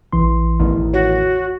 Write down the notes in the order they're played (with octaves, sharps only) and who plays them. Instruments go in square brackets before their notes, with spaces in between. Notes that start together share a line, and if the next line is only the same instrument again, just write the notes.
[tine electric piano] A#1 E3 C6
[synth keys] A1 E2 D#3
[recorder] F#4 [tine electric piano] C#5